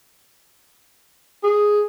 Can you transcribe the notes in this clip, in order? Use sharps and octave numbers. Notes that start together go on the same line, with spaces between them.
G#4